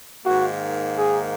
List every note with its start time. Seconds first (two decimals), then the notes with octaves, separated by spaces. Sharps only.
0.25 G#2 D#3 A#3 F#4
0.98 G#4